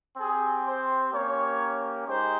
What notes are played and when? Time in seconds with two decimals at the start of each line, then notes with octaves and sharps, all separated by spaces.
0.16 C4 G4 G#4
0.64 C5
1.11 A#3 C#4 G4 C#5
2.05 G#3 D#4 G4 C5